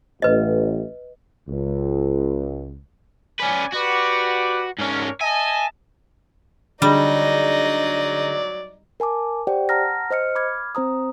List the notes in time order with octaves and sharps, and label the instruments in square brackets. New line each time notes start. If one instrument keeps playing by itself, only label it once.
[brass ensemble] A1 [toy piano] B4 D#5
[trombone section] C#2
[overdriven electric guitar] C#4 B4 [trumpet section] D5 G#5
[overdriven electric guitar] F#4 [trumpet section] G4 B4 D5
[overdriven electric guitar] G#2 C#4 [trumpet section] D4 A#4 C#5
[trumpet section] D#5 E5 A5 [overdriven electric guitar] G#5
[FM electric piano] D3 D4 G#4 [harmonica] F#3 D5 [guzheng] G3 [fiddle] D#4 D#5
[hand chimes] A#4 G#5 A5 D6
G4 C5 D5 F#5 G5
F#5 A5 A#5 F6 A#6
C5 D#5 F6 C#7
B5 D6 F6 G#6
C4 C5 A#5 D#6